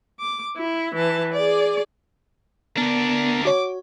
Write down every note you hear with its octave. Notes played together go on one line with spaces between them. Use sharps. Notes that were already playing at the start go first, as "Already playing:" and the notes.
D6
E4
E3 A5
G#4 D5
D2 B3 D4 A#4
F#4 C#5 D6